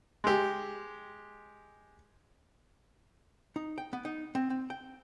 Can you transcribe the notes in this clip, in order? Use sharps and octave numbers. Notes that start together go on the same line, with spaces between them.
G#3 G4
D#4
G5
B3
D#4
C4
C4
G5